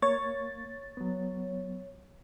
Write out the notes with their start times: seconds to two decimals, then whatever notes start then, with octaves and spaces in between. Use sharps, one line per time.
0.02 A#3 C#5 A6
0.97 F#3 B3